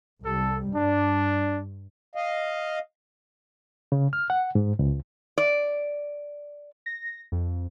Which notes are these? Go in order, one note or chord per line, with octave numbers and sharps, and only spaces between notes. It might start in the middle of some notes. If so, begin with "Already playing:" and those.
C2 G3 A4
G2 D4
D#5 F5
C#3
F6
F#5
G#2
C#2
D5
A#6
F2